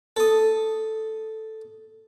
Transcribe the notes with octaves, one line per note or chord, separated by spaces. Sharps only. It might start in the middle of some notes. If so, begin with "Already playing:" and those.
A4 D#6